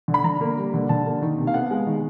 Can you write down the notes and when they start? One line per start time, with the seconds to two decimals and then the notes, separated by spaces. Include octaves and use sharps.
0.08 D3
0.14 B5
0.24 D3 A#5
0.41 A#3
0.57 G3
0.74 D3
0.89 D3 A5
1.06 A#3
1.22 D#3
1.38 C3
1.47 F5
1.54 B3 F#5
1.71 G#3
1.87 D#3